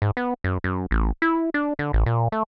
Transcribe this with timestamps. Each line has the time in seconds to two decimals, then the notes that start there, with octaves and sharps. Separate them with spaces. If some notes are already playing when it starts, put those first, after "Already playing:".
0.02 G#2
0.17 B3
0.44 F#2
0.64 F#2
0.91 A1
1.22 E4
1.54 D4
1.79 D3
1.93 A1
2.06 A#2
2.32 A3